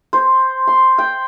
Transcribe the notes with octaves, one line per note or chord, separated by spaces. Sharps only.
C5
C6
G5